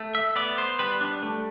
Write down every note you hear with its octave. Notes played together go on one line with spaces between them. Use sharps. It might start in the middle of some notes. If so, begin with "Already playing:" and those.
Already playing: A3
E5
B3 D5
C5
G3 B4
D4
A3